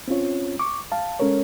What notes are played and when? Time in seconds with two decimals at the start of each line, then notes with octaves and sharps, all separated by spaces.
0.08 C4 C#4 F4 C#5
0.60 C#6 D6
0.92 F5 A5
1.19 G#3 C#4 A4 A#4 C#5